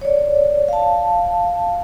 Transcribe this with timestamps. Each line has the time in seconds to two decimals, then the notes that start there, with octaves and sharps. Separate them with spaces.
0.01 C#5 D5
0.68 F5 A5